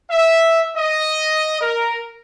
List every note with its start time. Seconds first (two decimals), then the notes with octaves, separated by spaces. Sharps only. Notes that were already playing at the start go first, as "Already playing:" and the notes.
0.11 E5
0.77 D#5
1.61 A#4